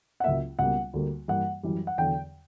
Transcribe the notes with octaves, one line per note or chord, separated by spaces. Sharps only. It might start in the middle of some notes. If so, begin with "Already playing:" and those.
F#5
C#2 C#3 F#3 A#3 E5
C#2 B2 G3 A#3 F#5
D2 D3 G3 A#3
G2 E3 G3 A#3 F#5
F#2 E3 G3
F#5
E2 D3 F#3 G5